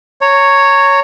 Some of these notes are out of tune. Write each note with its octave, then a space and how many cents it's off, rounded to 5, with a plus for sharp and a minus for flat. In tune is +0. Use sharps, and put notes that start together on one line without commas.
C#5 +0 A#5 -25